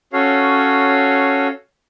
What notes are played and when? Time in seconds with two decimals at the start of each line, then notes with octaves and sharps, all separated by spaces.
0.13 C#4 F#4 A4 C#5 F5